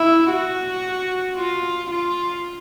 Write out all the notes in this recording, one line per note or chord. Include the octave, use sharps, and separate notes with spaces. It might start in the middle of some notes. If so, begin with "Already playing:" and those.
Already playing: E4
F#4
F4
F4